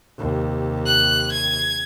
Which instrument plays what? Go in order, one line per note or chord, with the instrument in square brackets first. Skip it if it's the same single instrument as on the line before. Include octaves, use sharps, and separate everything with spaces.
[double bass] D#2 C3
[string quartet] F#6
G#6